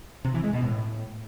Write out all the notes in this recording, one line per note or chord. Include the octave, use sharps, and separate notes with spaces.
C3
E3
G#3
B2
A2